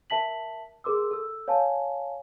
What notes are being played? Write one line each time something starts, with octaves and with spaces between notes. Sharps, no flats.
A#4 E5 A5 B6 F#7
G#4 A#4 C6 D6 E6
A4 E6
C#5 F5 G#5 A5